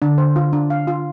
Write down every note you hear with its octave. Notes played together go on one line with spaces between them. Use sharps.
D3 D4
C5
F4
D4
F5
F4